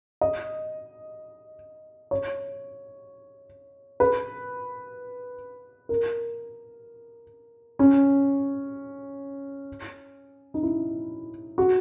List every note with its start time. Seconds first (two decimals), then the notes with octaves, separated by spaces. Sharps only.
0.21 D#5
2.11 C#5
4.00 B4
5.89 A#4
7.79 C#4
10.54 D#4
10.63 E4
11.58 F#4